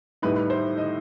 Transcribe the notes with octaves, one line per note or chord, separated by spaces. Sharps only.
A2 G3 D#4 B4
B4
C5
D#5